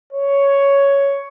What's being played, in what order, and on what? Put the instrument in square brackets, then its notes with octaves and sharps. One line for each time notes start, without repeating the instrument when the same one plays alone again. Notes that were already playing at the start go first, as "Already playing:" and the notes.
[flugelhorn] C#5